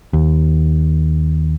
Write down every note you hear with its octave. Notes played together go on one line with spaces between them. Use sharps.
D#2